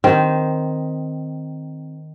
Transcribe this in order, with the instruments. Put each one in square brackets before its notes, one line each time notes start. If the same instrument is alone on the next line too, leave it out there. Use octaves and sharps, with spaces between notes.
[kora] D#3 C4